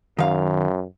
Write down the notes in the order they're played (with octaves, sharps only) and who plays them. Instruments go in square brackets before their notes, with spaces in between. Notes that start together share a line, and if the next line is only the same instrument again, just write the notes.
[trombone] F#2 [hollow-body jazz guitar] D#3 F5